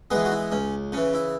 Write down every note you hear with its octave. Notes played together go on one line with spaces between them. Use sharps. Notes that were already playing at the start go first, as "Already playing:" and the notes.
E3 G#3 B3 G#4
F#4
E4
C#2 C#4
C#3 E3 C#4
E4